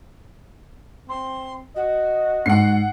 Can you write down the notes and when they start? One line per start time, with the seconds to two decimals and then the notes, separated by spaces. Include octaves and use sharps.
1.09 C4 C6
1.75 F#4 D#5
2.46 G#2 F#5 C7